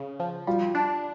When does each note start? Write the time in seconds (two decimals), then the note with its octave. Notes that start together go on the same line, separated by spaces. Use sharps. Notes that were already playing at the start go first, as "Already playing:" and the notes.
Already playing: C#3
0.20 F3
0.47 G3 F4
0.75 D4